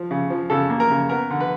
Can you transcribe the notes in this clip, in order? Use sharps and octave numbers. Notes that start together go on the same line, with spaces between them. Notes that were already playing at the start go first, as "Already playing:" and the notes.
Already playing: F3
C#3
F3
C#3 A4
A#3
A#4
C#3
B3 A#4
D3
B4